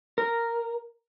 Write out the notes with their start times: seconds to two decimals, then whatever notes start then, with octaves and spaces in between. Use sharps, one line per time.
0.18 A#4